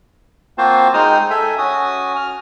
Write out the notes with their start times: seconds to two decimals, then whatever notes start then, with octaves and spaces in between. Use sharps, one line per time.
0.58 A#3 C4 F4 F#4 C5 A5
0.94 G#3 D#4 G5 D#6 F6
1.30 A4 E5 G#5
1.58 C#4 F#4 D#6
2.16 F6